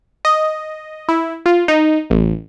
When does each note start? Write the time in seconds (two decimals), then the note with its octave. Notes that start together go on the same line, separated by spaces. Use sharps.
0.25 D#5
1.09 E4
1.46 F4
1.68 D#4
2.10 A1